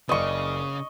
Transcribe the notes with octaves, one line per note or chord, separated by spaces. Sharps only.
F#1 C#3 D5 D#5 C#6